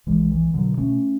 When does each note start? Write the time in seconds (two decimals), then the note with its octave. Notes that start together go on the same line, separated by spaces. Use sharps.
0.06 B1 E3 G#3
0.31 E3
0.54 B2 D3 F#3
0.78 A3 C#4